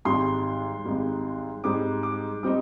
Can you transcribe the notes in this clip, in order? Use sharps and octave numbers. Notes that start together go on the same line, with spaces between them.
G#1 G#2 G3 C6
G#1 G#2 G3
G#2 G3 C4 D#4 D6
D6
G3 C4 D#4 D6